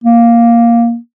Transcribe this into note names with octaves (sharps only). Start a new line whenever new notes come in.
A#3